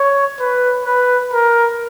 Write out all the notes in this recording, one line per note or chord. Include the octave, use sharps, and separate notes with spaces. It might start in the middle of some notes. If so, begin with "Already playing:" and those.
Already playing: C#5
B4
B4
A#4